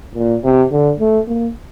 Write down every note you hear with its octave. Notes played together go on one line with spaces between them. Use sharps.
A#2
C3
D3
A3
A#3